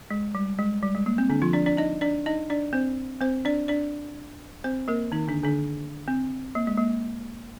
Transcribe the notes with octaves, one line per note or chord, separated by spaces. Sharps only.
G#3
G3
G#3
G3
G#3
A#3
C4
D3 D4
F3 F4
D4 D5
D4 D5
D#4 D#5
D4 D5
D#4 D#5
D4 D5
C4 C5
C4 C5
D4 D5
D4 D5
C4 C5
A#3 A#4
D#3 D#4
D3 D4
D3 D4
C4
A#3
G#3
A#3